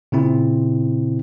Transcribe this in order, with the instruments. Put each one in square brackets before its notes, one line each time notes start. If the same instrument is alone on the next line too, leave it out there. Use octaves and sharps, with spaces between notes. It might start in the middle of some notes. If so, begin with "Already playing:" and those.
[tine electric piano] A#2 C#3 C4 E4